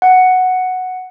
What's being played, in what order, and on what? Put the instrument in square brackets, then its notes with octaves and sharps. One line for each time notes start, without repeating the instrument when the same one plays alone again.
[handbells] F#5